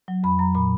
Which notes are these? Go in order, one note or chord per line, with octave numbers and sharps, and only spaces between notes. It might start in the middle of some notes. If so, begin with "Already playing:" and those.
F#3
F2 B5
F#3 A#5
A#2 B5